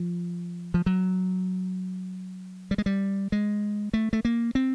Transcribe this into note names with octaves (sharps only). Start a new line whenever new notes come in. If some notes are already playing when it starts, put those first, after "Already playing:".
Already playing: F3
F3
F#3
G3
G#3
G3
G#3
A3
A3
A#3
C4